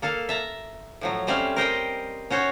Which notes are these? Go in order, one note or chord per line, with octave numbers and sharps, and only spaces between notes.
A#3 A4 F5 A5
E5 A5 A#5
A2 F3 F#3
G3 A3 C4 C#4 F5
A#4 C5 D#5 G5
C#4 F#4 C5 C#5